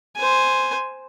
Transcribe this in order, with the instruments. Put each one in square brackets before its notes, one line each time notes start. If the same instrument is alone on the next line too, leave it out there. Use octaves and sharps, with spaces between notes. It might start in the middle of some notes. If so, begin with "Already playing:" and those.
[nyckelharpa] C5 G#5